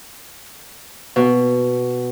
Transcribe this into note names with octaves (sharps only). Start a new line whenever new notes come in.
B2